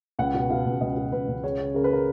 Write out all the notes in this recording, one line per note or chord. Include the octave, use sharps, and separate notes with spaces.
C#2 F#5
B2
B2 F5
C#2
C#2 D#5
B2
C#2 B4
C#2
C#3 C#5
C#3
C#3 A#4
B4
A#4